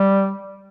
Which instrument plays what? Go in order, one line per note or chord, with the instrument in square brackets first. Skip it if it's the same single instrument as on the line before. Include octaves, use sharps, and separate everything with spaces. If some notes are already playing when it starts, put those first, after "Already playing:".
Already playing: [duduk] G3